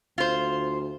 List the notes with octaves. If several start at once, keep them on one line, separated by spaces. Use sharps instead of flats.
D2 F4 C5